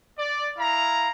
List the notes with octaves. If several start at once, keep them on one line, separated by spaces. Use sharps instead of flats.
D5
E4 F5 A#5